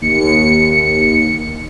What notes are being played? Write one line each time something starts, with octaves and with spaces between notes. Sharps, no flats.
D#2 C#7